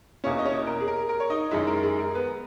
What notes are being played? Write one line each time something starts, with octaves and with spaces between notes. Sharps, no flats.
E2 B2 A#3 C#4 E4 C#5
D#5
C#4 C#5
A#4
G#4
A#4
A#4
C#5
D#4 D#5
F#2 D#3 G#3 E4 E5
A#4
G#4
A#4
B3 B4